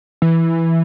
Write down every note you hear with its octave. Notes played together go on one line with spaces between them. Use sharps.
E3